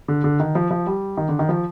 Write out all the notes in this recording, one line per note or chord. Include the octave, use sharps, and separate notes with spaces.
D3
D3
D#3
F3
F3
G3
D#3
D3
D#3
F3